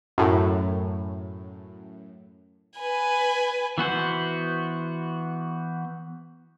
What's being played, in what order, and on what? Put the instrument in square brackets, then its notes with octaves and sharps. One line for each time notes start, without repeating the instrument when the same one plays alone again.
[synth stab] F#2 A2
[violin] B4 G#5
[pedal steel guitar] E3 B3 F#4 C5